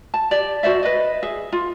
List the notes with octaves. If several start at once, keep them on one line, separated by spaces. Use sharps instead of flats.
A5
G4 D5
F#4 C5 D5 E5
B4 D#5
G#4 E5
F4